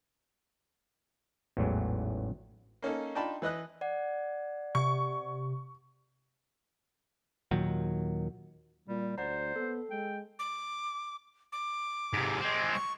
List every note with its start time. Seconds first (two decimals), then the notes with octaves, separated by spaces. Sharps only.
1.57 A1 E2 G#2 E3 F#3
2.82 A#3 C#4 D#4 A4
3.15 D4 D#4 F4 G5 A5 B5
3.42 E3 B4 D#5 F#6
3.81 D5 F#5
4.75 C3 C#6
7.51 D#2 A#2 D#3 F#3
8.88 A#2 G3
9.18 D2 C5 D5 F#5 A#5
9.56 B3 A4
9.90 G#3 G5
10.39 D6
11.52 D6
12.14 G#2 C3
12.40 G#3 C4
12.73 C#6